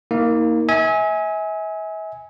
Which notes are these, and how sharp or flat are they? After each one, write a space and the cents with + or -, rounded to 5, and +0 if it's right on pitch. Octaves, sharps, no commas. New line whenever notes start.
A#3 +0 D#4 +35
E5 -40 G#5 +0